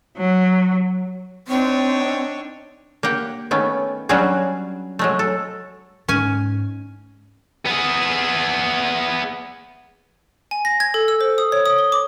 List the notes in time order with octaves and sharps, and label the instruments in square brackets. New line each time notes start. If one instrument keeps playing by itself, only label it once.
[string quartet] F#3
[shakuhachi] C4 [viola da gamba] D4 D#4 C#5
[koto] A#3 G4 F#5 G5
D#3 A3 B3 C#4
F#3 G3 C#4 D4 F#4 G#4
F#3 G#3 A3
A4
[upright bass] G#2 [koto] C#4 G#5
[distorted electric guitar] B3 G#4
[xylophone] G#5
A#6
G#6
A4
E6
C5
D#6
C#5
D#6
G7
D6